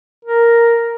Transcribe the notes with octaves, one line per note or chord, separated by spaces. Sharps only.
A#4